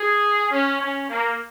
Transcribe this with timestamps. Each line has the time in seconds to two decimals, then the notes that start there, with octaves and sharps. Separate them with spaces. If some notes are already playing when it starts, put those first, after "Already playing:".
Already playing: G#4
0.50 C#4
0.79 C#4
1.08 A#3